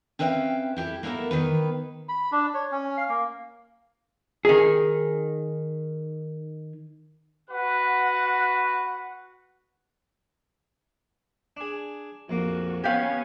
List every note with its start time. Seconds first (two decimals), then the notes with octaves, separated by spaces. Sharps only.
0.19 C4 C#4 B4 E5 F5 G5
0.76 E4 G4 A4
1.03 A#3 B3 E4 A4 A#4
1.31 D#3 A#3 B4
2.09 B5
2.32 D4
2.55 C#5
2.72 C#4
2.97 F5
3.09 A#3
4.45 D#3 G#4
7.51 F#4 B4 F#5
11.57 D4 G#4
12.29 A#1 F2 A#3 F#4
12.84 B3 C#4 G4 F5 G#5